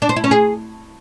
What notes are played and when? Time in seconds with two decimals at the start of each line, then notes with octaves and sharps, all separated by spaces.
0.02 D4
0.09 C5
0.16 E4
0.24 C#4
0.31 G#4